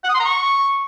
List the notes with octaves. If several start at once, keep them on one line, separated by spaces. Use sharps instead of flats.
F#5
D#6
C6
A#5
C#6